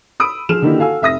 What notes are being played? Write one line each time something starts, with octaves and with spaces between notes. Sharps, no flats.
B5 D#6 E6 D7
F3 G#4 F6 E7
D3 D#3 A#3 D#4 E4 G4
F#4 A4 F5 G#5 E6
F1 E5 D#6 A#6